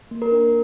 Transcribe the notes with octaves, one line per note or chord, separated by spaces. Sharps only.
A#3
A#4
D4